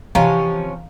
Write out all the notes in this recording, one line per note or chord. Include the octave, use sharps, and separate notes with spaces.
C3 E3 F3 C#4 D#5 F5 A#5